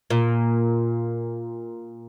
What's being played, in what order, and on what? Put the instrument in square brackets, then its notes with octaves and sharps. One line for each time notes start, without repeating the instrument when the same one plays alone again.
[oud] A#2